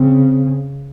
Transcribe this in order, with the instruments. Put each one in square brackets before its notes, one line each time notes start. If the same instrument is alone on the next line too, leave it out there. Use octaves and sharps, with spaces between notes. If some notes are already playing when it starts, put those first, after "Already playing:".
Already playing: [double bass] C#3 [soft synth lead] C4